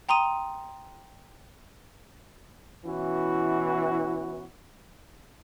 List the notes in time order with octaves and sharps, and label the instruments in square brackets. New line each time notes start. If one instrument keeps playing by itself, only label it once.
[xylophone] G5 A#5 C6 D#6 D#7
[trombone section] B2 E3 C#4 E4 F#4